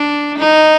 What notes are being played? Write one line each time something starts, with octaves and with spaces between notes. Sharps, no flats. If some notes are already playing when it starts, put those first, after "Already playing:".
Already playing: D4
D#4